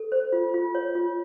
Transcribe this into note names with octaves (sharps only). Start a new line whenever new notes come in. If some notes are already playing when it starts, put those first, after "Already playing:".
Already playing: A4
C5
F4
F4
C#5
F4